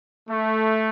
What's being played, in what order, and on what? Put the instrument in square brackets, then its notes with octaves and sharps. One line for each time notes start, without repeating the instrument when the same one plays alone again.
[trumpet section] A3